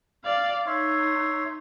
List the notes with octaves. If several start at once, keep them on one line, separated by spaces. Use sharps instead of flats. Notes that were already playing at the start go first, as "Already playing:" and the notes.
D5 F5
D#4 C#5 E5 C6